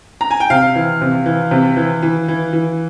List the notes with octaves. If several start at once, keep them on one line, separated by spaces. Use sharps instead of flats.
A#5
G#5
G5
C3 F5
E3
C3
E3
C3
E3
E3
E3
E3